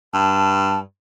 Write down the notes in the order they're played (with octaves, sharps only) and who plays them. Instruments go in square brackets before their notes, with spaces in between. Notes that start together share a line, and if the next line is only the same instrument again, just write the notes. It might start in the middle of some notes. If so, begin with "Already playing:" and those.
[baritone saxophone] G2 [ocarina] A5